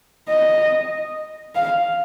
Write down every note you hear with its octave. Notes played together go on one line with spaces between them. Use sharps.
D#5
F5